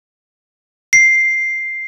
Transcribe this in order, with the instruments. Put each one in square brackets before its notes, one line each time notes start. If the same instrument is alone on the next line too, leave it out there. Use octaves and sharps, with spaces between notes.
[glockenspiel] C7